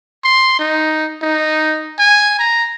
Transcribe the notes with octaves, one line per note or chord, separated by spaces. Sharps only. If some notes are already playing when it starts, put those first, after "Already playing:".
C6
D#4
D#4
G#5
A#5